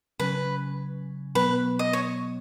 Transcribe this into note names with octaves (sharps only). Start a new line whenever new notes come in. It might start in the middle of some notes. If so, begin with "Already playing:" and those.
C#3 F#3 C#4 B4
B2 F#3 B3 B4
D#5
C#5